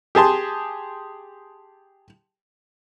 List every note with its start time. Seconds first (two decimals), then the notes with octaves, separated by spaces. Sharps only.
0.15 G4 G#4 A5 C6